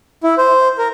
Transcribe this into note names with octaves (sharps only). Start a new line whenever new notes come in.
E4
C5
A#4